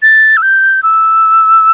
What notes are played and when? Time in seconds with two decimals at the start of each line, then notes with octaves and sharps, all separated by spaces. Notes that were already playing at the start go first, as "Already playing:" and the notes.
0.02 A6
0.37 E6
0.42 G6
0.83 E6